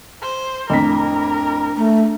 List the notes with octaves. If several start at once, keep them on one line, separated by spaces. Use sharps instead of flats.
C5
F2 A2 D4 A#4 B6
A3